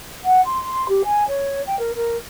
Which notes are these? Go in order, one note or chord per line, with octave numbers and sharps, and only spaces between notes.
F#5
C6
G4
G#5
C#5
G5
A#4
A#4